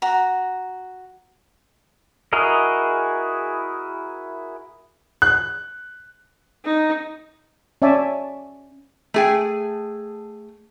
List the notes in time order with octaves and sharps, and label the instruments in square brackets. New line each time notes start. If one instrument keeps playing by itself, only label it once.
[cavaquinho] F#4 A#5
[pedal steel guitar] E4 F#4 G#4 A#4 D#5
[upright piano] F#6
[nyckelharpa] D#4
[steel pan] C#4 C#5 D5 E5 G#5 A5
[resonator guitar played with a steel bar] A3 G#4 G5